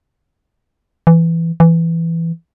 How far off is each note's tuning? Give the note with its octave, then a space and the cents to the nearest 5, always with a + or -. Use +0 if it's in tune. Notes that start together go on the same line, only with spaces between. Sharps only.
E3 +10
E3 +10